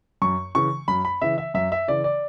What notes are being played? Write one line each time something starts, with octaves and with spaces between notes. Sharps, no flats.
F#2 C#6
C#3 E3 C#6
F#2 B5
B5
C#3 E3 E5
E5
F#2 E5
E5
C#3 E3 D5
D5